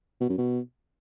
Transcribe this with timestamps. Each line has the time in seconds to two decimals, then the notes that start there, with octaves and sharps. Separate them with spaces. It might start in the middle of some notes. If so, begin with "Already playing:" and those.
0.21 B2
0.29 F#2
0.38 B2